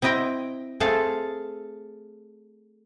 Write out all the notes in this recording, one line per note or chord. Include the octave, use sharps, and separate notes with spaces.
C4 E4 D#5 G5
A3 C4 G#4 A4 F5